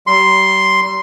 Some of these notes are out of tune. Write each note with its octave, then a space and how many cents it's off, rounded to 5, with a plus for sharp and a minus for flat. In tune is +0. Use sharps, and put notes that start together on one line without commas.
G3 -35 C6 +0